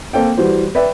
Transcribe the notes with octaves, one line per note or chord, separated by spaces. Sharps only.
A#3 C4 A4 G5
E3 G3 F#4 C5
B4 D5 E5 G5